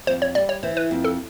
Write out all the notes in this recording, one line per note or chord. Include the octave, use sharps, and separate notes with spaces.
F2 C5
C#5
G3 D5
C#5
E3 C5
B4
F2
A4